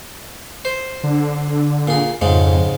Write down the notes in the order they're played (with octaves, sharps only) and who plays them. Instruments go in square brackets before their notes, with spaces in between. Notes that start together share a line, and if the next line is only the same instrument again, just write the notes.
[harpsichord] C5
[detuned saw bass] D3
[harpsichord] A#2 G#4
[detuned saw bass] F2 [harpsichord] G#2 C#3 G#3